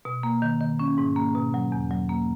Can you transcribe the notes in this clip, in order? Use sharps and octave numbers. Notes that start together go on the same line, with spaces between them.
B2
A#3
D#3
D#3
C#4
G#2
A#3
B2
F#3
E2
F#3
A#3